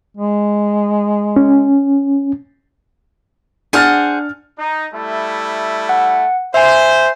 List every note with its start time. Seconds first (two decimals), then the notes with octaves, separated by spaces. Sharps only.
0.17 G#3
1.36 C#4
3.73 D4 G#4 C5 F#5 F6 A6
4.58 D#4
4.92 G3 A3 E4
5.89 F#5
6.54 C5 E5 G#5